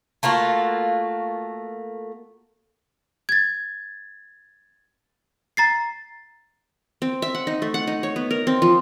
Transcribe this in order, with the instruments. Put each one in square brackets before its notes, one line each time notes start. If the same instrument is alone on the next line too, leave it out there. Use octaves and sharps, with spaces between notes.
[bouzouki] A3 A#3 F4 F#4
[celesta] G#6 A6
A#5 A6 C7
[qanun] C4
E5
F#5
D#4
A3
F#5
D#4
C#5
B3
A#4
C4
F3